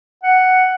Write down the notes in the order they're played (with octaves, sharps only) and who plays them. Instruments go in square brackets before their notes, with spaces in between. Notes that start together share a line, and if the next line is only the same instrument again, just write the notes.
[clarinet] F#5